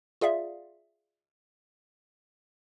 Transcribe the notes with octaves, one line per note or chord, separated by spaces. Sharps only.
F4 G#4 D5 E5 F5